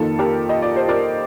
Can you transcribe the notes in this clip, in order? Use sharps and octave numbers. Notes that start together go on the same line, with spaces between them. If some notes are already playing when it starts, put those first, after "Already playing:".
Already playing: F2 D#3 A#3 F4 A4
G4 A#4
D#5
D5
C5
A#4 D5